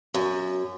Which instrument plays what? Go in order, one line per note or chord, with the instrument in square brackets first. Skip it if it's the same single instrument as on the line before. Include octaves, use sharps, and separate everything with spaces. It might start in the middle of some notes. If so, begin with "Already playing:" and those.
[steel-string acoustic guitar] F#2